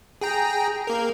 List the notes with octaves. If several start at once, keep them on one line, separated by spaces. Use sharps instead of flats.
G#4 G5 A#5
A#3 A#4